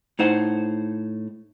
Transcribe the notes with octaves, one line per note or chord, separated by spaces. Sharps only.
A2 D#4 C5 F#5